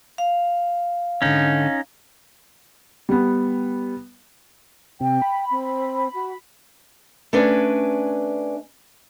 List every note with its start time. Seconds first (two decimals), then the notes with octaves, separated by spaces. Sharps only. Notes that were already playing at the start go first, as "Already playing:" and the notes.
0.18 F5
1.22 G#2 D3 C#4 D#4
3.09 G3 B3
5.00 C3 G5
5.22 B5
5.50 C4
6.14 F#4
7.33 A3 C#4 D4 B4 G#5